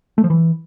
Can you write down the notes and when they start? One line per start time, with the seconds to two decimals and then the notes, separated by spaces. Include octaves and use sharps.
0.18 A3
0.24 F3
0.30 E3